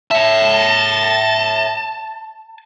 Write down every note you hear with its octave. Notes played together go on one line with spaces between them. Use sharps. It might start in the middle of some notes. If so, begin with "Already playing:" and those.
C#5 E5 A5